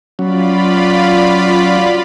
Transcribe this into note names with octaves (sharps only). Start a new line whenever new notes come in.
F#3 C#4 F4 D5 B5